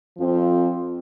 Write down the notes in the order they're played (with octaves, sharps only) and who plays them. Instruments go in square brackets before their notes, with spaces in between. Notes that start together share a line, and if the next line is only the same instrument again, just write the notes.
[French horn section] F2 F3 C4 F4